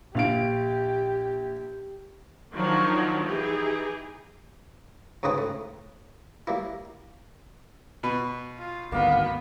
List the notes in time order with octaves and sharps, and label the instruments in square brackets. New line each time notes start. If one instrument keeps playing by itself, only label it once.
[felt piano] A#1 F5 D7 [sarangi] G4
[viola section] D#3 F3 F#3 D4 D#4
E3 D#4 G4 G#4
[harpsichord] G#2 C#3 D#4 B4 C5 G5
A2
G3 A#3 E4
[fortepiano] B2 B4
[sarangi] F4
[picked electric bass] G#1 D2 G2 [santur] A#3 F5 D#6 [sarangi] B3